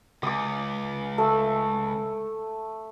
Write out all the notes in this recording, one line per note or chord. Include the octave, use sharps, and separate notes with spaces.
C#2 D6 D#6
A3 E6